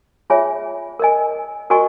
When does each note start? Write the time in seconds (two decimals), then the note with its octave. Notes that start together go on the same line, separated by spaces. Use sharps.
0.30 F4 G#4 C#5 E5 G#5
0.99 A#4 D#5 G#5
1.70 F#4 A#4 D#5 G#5 C#6